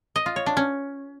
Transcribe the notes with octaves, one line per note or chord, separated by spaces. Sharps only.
D#5
F4
C#5
D4
C#4